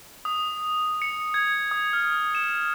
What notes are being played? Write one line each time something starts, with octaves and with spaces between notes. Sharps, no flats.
D#6
C#7
G#6
D#6
F6
E7